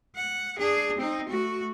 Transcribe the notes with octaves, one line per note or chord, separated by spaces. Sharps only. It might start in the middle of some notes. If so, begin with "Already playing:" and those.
F#5
D4 G#4
C4 D#4
A3 F#4